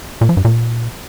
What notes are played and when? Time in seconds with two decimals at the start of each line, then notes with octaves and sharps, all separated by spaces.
0.21 A#2
0.29 F3
0.37 G2
0.45 A#2